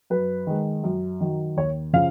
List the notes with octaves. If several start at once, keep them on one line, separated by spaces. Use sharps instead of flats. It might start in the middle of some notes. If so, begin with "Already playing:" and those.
F#2 B4
D#3 G#3
F#2
D#3 F#3
D#2 C#5
C#3 F3 F5